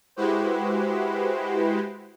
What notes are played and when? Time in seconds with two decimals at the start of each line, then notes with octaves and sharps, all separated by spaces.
0.16 G#3 E4 F#4 G4 B4 C5